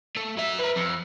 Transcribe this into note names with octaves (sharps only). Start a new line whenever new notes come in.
A3
F#3 E5
A#4 B4
F2